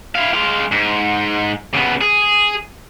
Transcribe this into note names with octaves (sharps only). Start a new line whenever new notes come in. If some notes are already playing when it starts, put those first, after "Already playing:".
E4 F5
G#3 F5
G#2
C#3 B3
G#4